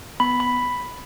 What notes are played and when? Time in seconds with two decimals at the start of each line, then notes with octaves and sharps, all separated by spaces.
0.20 B3 B5
0.40 B5